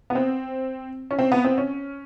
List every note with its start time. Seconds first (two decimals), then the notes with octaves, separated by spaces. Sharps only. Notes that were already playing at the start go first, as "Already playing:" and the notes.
0.10 B3
0.15 C4
1.11 C#4
1.19 C4
1.32 B3
1.44 C4
1.58 C#4